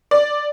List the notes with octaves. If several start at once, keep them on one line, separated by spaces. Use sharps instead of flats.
D5